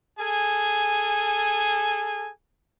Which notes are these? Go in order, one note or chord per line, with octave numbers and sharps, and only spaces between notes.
G#4 A4 G#5